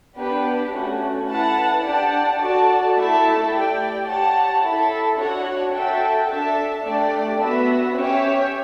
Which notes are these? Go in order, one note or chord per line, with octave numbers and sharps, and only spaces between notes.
B3 D4 G4 B4
A3 C#4 F#4
E4 B4 F#5 A5
D4 G4 D5 F#5 A5
F#4 A4 D5 A5
A3 E4 A4 E5 A5
G4 D5 G5
G4 C#5 F#5 A5
E4 A4 E5
D4 F#4 C#5 F#5
F#4 A4 E5 G5
D4 A4 E5 A5
A3 D4 G4 D5
B3 F#4 B4 E5
C#4 G4 C#5 E5